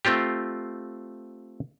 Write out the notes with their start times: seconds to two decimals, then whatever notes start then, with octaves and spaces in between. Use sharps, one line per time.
0.05 A3 C4 F4 G4